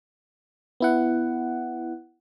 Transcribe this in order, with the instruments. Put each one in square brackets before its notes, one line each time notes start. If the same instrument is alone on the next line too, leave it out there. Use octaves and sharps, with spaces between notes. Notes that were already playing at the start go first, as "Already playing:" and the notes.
[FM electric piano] B3 E4 F#5